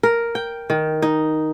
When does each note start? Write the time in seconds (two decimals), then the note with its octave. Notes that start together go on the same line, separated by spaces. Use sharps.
0.03 A#4
0.35 G5
0.70 D#3
1.02 D#4